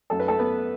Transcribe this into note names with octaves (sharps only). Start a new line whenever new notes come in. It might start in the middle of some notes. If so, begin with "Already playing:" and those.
F#2 F#3 A3 A4
B4
A3 A4
B3 B4